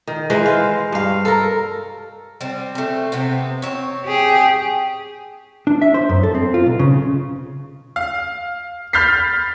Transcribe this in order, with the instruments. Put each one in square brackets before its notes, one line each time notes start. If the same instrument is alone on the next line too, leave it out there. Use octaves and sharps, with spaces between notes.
[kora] D#3
E3 G#3 B4 C5
F5
G2 F5
A4 A#4
[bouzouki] G3 C4
A3 C4
C3 B3 C4
C4 C#5
[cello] G4 G#4 [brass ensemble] G5
[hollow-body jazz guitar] D4
E5
C5
F#2
A4
C4
F4
B1
C#3
[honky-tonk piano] F5
B5 F6 G6 A6 B6 C7